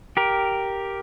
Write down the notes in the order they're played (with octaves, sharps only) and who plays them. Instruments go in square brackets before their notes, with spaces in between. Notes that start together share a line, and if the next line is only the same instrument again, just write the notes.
[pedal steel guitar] G4 A#4